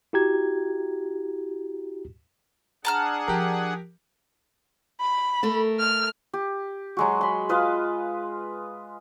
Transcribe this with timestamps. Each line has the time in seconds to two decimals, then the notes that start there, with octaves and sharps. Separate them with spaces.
0.13 E4 F#4 G4 A#5 G#6
2.85 D4 G#4 F#5 A5 A#5 F6
3.28 F3 G4 A#4
5.00 B5
5.43 A3 A4 A#4
5.79 F6
6.33 G4
6.97 F#3 G#3 F#4
7.21 B5 C6
7.49 F4 B4 D#5 F5